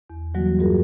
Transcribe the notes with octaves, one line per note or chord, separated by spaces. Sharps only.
E2
D3 E3 F#3 G3 A#3 F#4
G2 F#3 F4 F#4 G#4 A#4